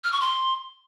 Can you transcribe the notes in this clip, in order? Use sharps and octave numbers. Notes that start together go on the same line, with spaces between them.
F6
C#6
C6